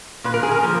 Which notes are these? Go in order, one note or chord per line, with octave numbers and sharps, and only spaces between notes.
A#2 B4
A#4
G#4
A#4
F3 A#3